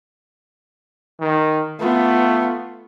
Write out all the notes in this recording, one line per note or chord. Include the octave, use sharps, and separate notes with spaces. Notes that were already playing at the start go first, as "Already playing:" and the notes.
D#3
A3 B3 F4